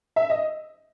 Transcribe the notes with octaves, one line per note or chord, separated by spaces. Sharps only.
E5
D#5